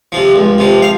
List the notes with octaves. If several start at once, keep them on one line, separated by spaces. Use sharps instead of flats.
C3 F3
C#2
C3 F3
F5